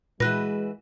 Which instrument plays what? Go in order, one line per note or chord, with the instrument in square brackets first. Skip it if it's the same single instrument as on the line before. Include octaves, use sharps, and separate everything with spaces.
[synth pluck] A#2 [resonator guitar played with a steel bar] E3 F#4 B4 [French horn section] G#3 [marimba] F#6 A#6